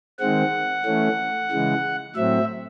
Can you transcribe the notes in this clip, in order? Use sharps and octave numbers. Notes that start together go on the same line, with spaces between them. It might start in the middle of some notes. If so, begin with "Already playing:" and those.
D#3 G#3 C4 F#5
E3 A3 C#4
C#3 E3 G#3
A2 F#3 C4 E5